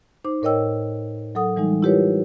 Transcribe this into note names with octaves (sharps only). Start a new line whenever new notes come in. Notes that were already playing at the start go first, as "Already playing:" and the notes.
D#4 C5 D6
A2 A#4 C#5 D#5 G5 E6
F#3 A4 F#5 D#6
E3 G3 G#3 D#4
E4 F4 G4 A#4 B4 C#5